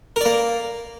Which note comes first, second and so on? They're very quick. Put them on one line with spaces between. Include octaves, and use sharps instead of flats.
A#4 D5 A#3